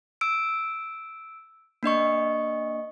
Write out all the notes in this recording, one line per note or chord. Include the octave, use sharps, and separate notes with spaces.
E6 D7
A#3 D4 D#5 C#6